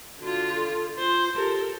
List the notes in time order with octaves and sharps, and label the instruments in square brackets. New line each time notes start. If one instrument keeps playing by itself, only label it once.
[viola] D3 F4 [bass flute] F#4
[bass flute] A4
[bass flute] F4 [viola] C5
[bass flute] G4 [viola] A4 A#4